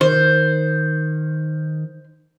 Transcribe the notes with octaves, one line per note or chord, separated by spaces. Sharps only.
D#3 C5